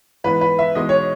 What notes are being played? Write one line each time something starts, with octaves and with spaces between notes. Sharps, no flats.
G#2 E3 B3 B4
B4
E5
E2 B2 G#3 D#4 D#5
C#5